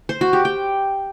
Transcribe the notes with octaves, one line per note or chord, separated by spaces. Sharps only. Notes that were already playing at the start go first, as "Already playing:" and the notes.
C5
F#4
G4
G5